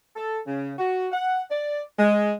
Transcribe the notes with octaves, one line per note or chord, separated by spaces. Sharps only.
A4
C#3
F#4
F#5
D5
G#3